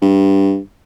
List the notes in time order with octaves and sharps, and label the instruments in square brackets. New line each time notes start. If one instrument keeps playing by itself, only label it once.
[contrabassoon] G2